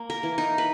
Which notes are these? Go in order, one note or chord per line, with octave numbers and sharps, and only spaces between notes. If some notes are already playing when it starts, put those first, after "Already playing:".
Already playing: A#3
A#4
E3
D#4
B4